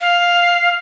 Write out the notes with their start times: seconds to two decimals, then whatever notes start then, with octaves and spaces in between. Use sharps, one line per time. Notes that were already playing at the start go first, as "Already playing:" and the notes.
0.01 F5